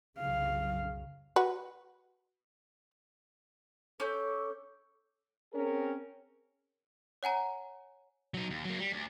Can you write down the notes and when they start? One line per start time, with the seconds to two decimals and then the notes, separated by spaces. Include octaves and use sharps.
0.19 C2 F#2 C#3 F#3 F5
1.36 F#4 B4
4.00 C#4 A4 D6 G6
5.53 C4 C#4 G#4 A#4
7.23 C#5 F#5 G#5 A#5
8.34 F#3 D#4
8.50 D#2
8.65 F#3 A#3
8.80 G3
8.93 D2